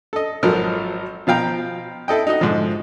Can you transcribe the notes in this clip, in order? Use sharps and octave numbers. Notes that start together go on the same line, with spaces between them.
A4 D#5
G#1 F3 F#3 A4 A#4 F6
B2 F3 F5 G5 A#5
E4 A4 D#5 G5
D#4 F#4 D#5
G#2 D3 F3